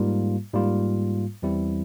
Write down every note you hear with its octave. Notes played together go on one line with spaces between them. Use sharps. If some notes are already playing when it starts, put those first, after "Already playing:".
Already playing: G#2 G3 A#3 F4
G#2 G3 A#3 F4
E2 E3 G3 C4 E4